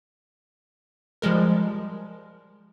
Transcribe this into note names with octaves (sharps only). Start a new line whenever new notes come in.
F3 G3 G#3 A#4